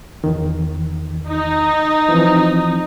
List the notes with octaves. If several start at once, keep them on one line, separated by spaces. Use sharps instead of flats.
E2 D#3
D#4
E3 F3 C4